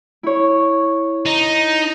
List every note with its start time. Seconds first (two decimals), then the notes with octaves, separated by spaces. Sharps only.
0.23 E4 C#5
1.26 D#4